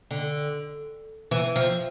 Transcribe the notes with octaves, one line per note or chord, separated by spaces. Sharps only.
D3
E3
F3